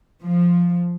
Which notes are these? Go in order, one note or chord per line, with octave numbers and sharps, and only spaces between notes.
F3